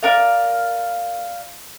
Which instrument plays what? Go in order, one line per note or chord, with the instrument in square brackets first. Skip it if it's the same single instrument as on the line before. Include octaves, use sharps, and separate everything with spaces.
[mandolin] A#4 D5 F5